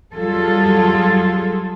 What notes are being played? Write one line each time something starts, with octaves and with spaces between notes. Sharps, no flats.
F#3 G3 F4 G#4 A4